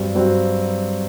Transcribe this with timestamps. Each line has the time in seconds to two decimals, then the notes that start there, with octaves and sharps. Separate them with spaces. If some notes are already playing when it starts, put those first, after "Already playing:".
Already playing: G2 F#3 C4
0.15 G2 F#3 C4